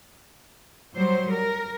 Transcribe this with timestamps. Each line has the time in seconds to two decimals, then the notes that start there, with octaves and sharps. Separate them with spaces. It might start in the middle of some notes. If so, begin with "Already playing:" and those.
0.94 F#3 G3 C5
1.32 A#4